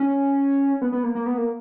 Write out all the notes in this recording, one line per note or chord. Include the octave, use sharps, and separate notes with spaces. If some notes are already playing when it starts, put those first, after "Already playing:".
Already playing: C#4
B3
B3
A#3
A#3
B3
A#3